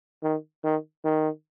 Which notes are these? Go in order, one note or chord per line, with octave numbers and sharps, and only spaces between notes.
D#3
D#3
D#3